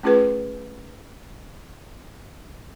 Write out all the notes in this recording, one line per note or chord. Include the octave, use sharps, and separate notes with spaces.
A3 C#4 F4 G#4 B4